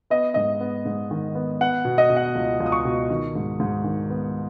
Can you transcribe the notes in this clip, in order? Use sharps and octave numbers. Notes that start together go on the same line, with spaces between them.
B3 D#5
G#2 D#5
B3
G#2
D#3
B3
B3 F#5
B2
D#5
B2
F#5
C#2
C#2
D#6
C#6
B2
D#3
G#2
G#2
D#3
B3